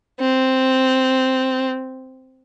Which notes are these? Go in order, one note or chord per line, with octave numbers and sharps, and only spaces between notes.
C4